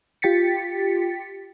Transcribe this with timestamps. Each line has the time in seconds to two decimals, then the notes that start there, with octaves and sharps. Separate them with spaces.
0.22 F4 G4 G5 A6 B6 C#7